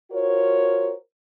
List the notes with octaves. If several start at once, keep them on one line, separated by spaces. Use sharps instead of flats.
F4 F#4 A#4 C5 C#5